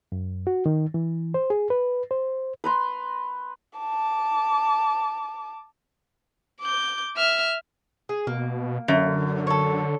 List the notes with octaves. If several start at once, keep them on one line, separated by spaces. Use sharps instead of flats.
F#2
F#4
D#3
E3
C5
G#4
B4
C5
B4 A#5 C6
A5 D6
D6 G6
E5 F6
G#4
B2 A#3
F#2 D3
A4 C#5